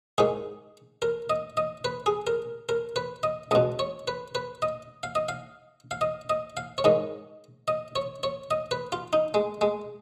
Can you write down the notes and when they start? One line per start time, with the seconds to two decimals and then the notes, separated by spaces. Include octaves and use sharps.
0.18 G#2 D#3 G#4
1.02 A#4
1.30 D#5
1.57 D#5
1.85 B4
2.06 G#4
2.27 A#4
2.69 A#4
2.96 B4
3.23 D#5
3.51 C#2 B2 D#5
3.79 C#5
4.08 B4
4.35 B4
4.62 D#5
5.03 F5
5.15 D#5
5.29 F5
5.91 F5
6.01 D#5
6.30 D#5
6.57 F5
6.78 C#5
6.84 G#2 D#3 D#5
7.68 D#5
7.96 C#5
8.23 C#5
8.51 D#5
8.71 B4
8.92 F4
9.13 D#4
9.34 G#3
9.61 G#3